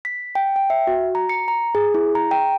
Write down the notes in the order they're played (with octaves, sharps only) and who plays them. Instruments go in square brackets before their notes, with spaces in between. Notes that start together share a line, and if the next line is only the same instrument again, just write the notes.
[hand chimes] B6
G5
G5
E5
F#4
A#5
C#7
A#5
G#4
E4
A#5
G5